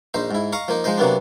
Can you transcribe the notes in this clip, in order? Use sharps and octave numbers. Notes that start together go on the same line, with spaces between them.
A#1 D#4 C5
G#2 E4
D#5 F5 A#5 C#6
F3 A#3 D#4
F3 G#3 D#4 C5 D#5
C3 F#3 A#3 B3 D4